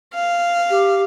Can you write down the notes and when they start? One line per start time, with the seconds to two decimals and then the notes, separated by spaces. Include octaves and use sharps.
0.14 F5
0.69 G4